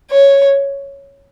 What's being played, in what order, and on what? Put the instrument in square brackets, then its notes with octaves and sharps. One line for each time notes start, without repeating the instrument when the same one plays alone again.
[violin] C#5